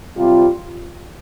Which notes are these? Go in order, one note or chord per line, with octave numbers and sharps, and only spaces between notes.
C3 G3 C4 F4